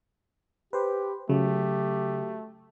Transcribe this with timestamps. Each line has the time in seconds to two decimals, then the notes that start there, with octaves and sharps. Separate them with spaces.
0.73 G4 B4 C5
1.29 C#3 F#3 A3 G4